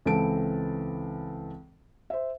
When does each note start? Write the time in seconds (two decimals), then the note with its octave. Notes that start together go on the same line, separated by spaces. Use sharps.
0.06 C#2 E3 C4 A4 A5 D7
2.10 C5 E5